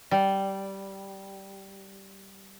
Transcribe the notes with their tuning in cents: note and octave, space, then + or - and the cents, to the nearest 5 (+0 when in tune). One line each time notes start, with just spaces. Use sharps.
G3 -10